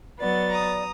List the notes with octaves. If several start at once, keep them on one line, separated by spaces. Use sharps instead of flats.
F#3 B3 D5 A6
A#5 D#6